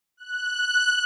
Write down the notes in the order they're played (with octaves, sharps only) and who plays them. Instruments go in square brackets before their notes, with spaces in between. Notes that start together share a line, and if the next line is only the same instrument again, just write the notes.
[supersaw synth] F#6